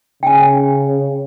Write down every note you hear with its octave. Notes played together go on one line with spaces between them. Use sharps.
C#3 G5 G#5